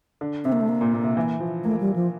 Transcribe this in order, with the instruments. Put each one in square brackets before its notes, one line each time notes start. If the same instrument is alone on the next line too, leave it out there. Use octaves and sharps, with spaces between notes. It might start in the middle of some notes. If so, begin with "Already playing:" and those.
[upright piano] D3
[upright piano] C3 [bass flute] C4
[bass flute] A#3
A3
A#3
[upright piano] A#2
A#2
C3
E3
F3
[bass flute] A3 [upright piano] A#3
[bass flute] G3
F3